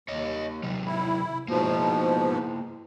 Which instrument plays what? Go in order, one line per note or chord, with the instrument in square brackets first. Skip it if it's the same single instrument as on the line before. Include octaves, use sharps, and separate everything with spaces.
[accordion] D#2 [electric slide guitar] C#5 D#5
[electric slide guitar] C3 D#3 F#3
[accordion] E4
[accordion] G#2 B2 F3 [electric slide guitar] A#3 E4